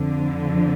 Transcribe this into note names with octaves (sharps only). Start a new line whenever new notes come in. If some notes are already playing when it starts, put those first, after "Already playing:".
Already playing: F2 D3 F3